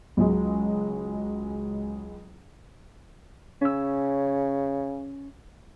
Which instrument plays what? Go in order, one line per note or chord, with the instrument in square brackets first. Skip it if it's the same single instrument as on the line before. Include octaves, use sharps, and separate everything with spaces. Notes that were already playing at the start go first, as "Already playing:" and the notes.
[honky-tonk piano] C#2 F#3 G#3
[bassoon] C#3 [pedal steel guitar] C#4 E6